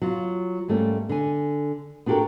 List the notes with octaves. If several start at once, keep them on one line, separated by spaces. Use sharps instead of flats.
F#3 F4
G#2 G3 A3 A#3 C#4
D3 G#5
B3 D4 F#4 G4 A4 A#4